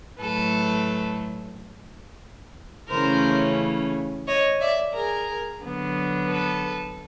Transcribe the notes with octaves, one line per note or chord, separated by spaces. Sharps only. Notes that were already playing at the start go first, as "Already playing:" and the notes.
A2 F#3 A3 A4 B4
C#3 E3 A3 C#4 A#4 C5
C#5 D#5
D5 E5
G#4 A#4
D3 F#3 B3
A4 B4